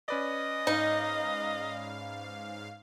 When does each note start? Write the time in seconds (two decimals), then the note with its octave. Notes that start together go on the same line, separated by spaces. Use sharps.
0.08 C#4 B4 D5 D#5
0.67 G#2 D#4 F5